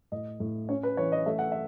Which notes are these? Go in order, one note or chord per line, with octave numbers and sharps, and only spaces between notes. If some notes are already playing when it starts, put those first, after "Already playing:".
A2 D#5
A2
C#4 C#5
B4
E3 C#5
D#5
A3 E5
F#5
E5